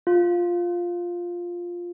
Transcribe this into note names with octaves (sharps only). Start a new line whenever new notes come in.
F4